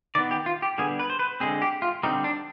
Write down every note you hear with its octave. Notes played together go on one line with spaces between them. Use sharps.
D#3 B3 D5
G4
F4
G4
D3 G3 B3 G#4
B4
C5
B4
D3 G#3 C4 G#4
G4
F4
D3 G3 C4 D#4
D4